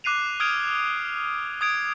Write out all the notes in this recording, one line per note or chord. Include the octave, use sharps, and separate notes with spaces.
D6 F#6 C7 D#7 F7
D#6 F6 G#6 D7
D#6 G#6 D7